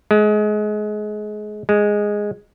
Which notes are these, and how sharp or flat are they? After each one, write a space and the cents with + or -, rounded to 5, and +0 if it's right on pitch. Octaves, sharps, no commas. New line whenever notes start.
G#3 +25
G#3 -5